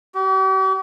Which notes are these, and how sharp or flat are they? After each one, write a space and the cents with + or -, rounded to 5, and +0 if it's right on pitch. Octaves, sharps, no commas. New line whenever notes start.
G4 -45